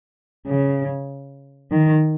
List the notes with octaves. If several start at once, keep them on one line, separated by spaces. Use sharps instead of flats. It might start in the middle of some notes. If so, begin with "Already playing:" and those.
C#3
D#3